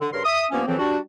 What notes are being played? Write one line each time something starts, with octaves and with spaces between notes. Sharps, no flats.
D3
G2 C#3 A#4 C6
E5 D#6
G2 F3 A#3 B3 C#4
F2 C#3 E3 F3 C4
G3 D4 F#4